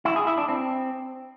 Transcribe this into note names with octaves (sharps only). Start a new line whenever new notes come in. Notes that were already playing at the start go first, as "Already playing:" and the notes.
E4
G#4
E4
D4
C4